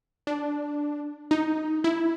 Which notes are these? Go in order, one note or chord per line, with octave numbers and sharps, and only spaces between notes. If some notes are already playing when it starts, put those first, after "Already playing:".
D4
D#4
E4